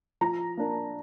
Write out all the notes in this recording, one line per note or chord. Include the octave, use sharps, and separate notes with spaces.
F3 A#5
A#3 D4